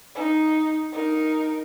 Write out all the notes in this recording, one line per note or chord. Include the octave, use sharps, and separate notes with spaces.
D#4
D#4 A#4